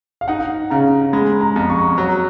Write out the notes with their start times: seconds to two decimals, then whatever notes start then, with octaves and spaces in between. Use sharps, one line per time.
0.21 F5
0.28 D#4 F#5
0.70 C#3 A#5
1.13 G#3 B5
1.41 A#5
1.56 F2
1.70 C#6
1.98 F#3